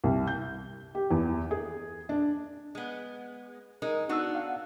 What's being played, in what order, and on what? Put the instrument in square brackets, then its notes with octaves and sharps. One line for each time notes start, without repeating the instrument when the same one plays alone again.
[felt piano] C2
G6
G4
E2
G#4
D4
[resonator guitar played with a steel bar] G#3 B3
[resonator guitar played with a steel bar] G#3 D#4 [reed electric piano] A#4 D#5
[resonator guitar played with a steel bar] B3 D4 F#4 [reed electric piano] D#4 E6
[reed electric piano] F5 F#5